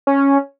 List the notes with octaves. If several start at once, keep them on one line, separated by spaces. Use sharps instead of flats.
C#4